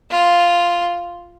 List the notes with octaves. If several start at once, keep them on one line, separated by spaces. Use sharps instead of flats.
F4